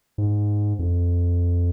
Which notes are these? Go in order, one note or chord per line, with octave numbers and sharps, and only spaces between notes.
G#2
F2